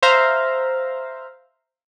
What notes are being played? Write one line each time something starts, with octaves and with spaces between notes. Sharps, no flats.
C5 E5 F5 A#5